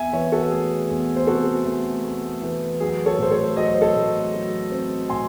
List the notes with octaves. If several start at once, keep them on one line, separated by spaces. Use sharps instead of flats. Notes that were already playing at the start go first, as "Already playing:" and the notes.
Already playing: E2 E5 G#5
E3 C#5 E5
F#4 A4
A3 G#4
E2
C5
C3 F#4 A4
A3
A3
E3
F#3 G#4
A4 C#5
A2 C5
A4 C#5
F#3 D#5
C#5
C5
A4 C#5
A2
F#3
C4
A2 G#5 C6